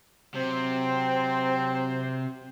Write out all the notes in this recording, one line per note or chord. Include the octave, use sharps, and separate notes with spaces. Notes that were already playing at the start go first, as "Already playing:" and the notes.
C3 F#3 C4 C5